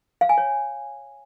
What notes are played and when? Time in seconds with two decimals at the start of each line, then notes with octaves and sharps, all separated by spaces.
0.21 F5
0.29 G#5
0.38 C#5